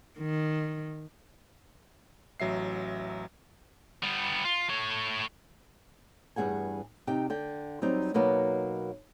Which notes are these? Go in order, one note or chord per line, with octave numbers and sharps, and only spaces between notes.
D#3
A1 F#3 E5 C7
G3 B3
F4
A3 C#5
E2 G2 A3 G#4 F#5 G#5
C3 D#4 G4 G5
D3 G5
F#3 G3 C4 D#4
B2 F#3 A#3 B3 D#4